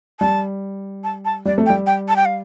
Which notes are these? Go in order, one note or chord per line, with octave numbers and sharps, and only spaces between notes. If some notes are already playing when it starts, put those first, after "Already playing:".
G3 A5
A5
A5
G3 D5
A3
G5
G3
G5
A5
G5
F5